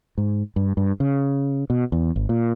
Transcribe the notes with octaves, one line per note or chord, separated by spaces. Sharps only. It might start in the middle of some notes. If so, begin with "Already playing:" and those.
G#2
G2
G2
C#3
B2
E2
G#1
A#2